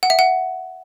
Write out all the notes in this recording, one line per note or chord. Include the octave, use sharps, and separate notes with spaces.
F#5
E5
F#5